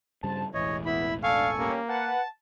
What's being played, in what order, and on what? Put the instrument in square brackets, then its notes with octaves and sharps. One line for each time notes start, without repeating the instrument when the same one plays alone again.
[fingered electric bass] G2 C#3 G3 [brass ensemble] C5 A5
[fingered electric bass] E1 A1 [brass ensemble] E2 E3 [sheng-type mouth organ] C#5 D#5
[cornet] B3 [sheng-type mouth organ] E4 B5
[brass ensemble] D4 [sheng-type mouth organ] A4 G#5 C#6 [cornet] F5
[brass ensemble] G3 C#4 [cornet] A#3
[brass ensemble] B4 F#5 [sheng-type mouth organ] A5